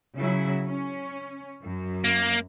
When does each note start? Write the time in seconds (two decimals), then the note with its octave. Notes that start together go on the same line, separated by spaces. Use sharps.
0.17 C#3 F#3 E4
0.66 C#4
1.62 F#2
2.04 A#3